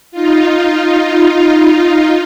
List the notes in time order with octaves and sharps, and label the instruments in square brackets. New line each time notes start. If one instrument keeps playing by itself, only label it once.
[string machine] D#4 F4